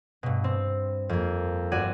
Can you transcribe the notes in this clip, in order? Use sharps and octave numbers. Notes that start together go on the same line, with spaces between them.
G2 B2
C4
F2 A#3
G1 F#4 D5 G#6 D#7